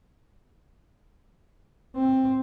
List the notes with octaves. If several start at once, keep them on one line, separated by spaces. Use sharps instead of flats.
C4